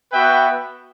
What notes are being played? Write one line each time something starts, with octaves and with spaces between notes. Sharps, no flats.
B3 F#4 B4 E5 G5